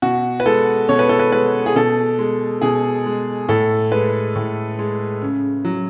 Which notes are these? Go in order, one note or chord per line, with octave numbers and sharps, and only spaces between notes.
B2 F#4
B4
G#3 A4
B2 C#5
B4
A4
B4
G#3 B4
G#4
B2 A4
G#3
B2 G#4
G#3
A2 A4
G#3 B4
A2
G#3
C#3
F#3